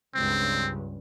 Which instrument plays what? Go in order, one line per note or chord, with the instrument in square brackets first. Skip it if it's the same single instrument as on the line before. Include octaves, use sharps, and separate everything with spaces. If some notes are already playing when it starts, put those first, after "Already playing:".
[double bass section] C#2 G2 [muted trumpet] C4